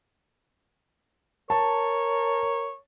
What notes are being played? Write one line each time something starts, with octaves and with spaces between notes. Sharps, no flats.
A#4 C#5 A5